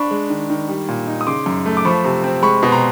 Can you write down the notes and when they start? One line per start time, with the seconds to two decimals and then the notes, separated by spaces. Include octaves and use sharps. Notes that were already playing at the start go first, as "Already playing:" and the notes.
Already playing: D4 B5 C#6
0.11 G#3
0.30 D#3
0.50 D#3
0.68 G3
0.88 A#2
1.07 D#4
1.21 D#6
1.27 C#3 C6 D6
1.46 F#2
1.66 A3
1.77 D6
1.85 F3 B5 C#6
2.05 C3
2.24 C4
2.42 G#3 B5 C#6
2.63 B2
2.72 A#5 C6